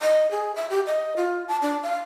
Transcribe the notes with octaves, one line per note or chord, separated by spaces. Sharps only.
D#5
G#4
E5
G4
D#5
F4
A5
D4
F5